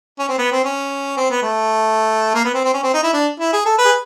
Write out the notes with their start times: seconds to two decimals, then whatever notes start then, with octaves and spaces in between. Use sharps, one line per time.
0.19 C#4
0.29 C4
0.38 B3
0.52 C4
0.65 C#4
1.17 C4
1.31 B3
1.43 A3
2.35 A#3
2.45 B3
2.54 C4
2.65 C4
2.74 C#4
2.83 C4
2.94 D#4
3.03 E4
3.13 D4
3.40 E4
3.53 G#4
3.66 A4
3.78 B4
3.85 G#4